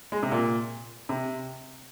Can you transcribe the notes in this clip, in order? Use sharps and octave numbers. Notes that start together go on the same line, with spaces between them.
G#3
C3
A#2
C3